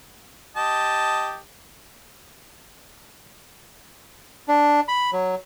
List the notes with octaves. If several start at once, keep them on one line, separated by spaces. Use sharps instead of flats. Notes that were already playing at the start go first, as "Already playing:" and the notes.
G4 D#5 A5
D4
B5
F#3